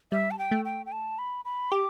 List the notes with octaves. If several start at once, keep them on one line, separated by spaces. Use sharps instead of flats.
G3 E5
A5
G5
A3
G5
G5
A5
B5
B5
G4 D6